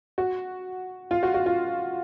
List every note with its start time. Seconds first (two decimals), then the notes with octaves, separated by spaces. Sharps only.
0.18 F#4
1.11 F4
1.23 F#4
1.34 F#4
1.46 F4